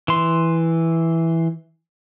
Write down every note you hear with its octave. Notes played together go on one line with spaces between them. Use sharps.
E3 C6